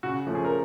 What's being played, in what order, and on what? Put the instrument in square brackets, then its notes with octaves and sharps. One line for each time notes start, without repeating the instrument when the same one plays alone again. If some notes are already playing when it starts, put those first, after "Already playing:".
[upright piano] C#3 F#4
F3 A3 C#4
G#4
A#4